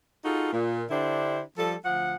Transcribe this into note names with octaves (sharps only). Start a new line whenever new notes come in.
D#4 F4 F#4 G#4 A4
A#2
D3 D4 E4 G4 C5
F3 G3 A4
D2 F3 F#5